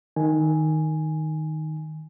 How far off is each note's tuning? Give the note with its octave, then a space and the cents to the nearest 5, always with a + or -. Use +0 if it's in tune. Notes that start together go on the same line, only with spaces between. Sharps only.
D#3 +0 G#5 +0